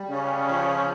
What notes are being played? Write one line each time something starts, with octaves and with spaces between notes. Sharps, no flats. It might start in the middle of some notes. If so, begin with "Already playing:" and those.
Already playing: G3
C#3 C#4
F3